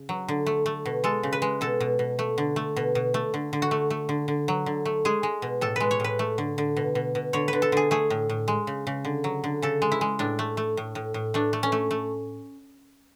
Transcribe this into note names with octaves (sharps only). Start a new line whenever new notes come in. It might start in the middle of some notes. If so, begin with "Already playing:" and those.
Already playing: C#3
F#3
D3
A3
A3
B2
G#3 A4
C#3
B4
G#3
B2 A4
B2
B2
A3
D3
A3
B2
B2
A3
D3
D3
F#4
A3
A3
D3
D3
F#3
D3
A3
G#3 G#4
G#3
B2
A2 A4
G#3 B4
C#5
A2 B4
A3
D3
D3
B2
B2
B2
D3 C#5
D3 B4
A4
D3 G#4
A3 G#4
A2
A2
G#3
C#3
C#3
D3
F#3
D3
C#3 A4
G#3
E4
G#3
A2 D4
A3
A3
A2
A2
A2
A3 D4
A3
C#4
A3
A3